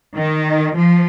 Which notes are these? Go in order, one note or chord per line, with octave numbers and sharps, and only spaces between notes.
D#3
F3